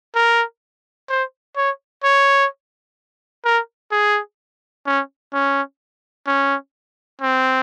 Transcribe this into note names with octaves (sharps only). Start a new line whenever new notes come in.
A#4
C5
C#5
C#5
A#4
G#4
C#4
C#4
C#4
C4